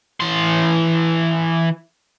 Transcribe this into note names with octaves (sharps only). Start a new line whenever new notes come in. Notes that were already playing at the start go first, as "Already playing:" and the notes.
E3 C6